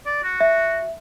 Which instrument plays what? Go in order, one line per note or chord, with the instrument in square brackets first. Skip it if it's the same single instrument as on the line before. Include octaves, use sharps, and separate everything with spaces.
[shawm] D5
F#4
[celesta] E5